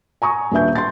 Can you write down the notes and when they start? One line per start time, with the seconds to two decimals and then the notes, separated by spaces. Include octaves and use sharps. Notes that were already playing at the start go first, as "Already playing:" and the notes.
0.22 G#5 A#5 C#6 D#6
0.51 D#1 D4 B4 E5 G6
0.75 C6 A6